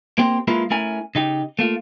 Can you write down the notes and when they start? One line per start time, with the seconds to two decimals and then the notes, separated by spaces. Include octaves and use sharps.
0.18 A#3 C4 G4 C5
0.48 G#3 A#3 E4 F4 A#4 B4
0.70 A3 C#4 E4 A#4 G#5
1.15 C#3 D#4 G4
1.59 A3 A#3 F4